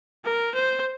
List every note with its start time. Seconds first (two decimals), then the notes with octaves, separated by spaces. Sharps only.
0.24 A#4
0.55 C5